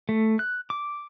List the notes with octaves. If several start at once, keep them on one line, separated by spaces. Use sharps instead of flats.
A3
F#6
D6